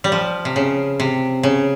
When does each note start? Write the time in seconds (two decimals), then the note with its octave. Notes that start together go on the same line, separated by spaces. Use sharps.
0.04 G3
0.12 F3
0.45 C3
0.56 C#3
1.00 C3
1.43 C#3